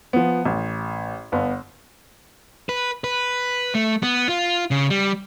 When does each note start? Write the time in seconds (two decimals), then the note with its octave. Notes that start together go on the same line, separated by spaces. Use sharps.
0.13 F3 B3
0.45 A1
1.32 G1 B3
2.69 B4
3.04 B4
3.75 A3
4.03 B3
4.29 F4
4.71 C#3
4.90 G3